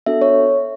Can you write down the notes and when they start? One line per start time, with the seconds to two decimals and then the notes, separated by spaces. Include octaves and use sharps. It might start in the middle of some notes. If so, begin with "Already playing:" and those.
0.06 B3 D4 F#4 A4 E5
0.22 C#5